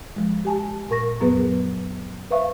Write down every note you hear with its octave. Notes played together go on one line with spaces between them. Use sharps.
F3 G#3
G4 G#5 A5
A#2 A#4 C#6 A#6
F#2 F#3 B3 G#4 B4
B4 C5 E5 F5 C#6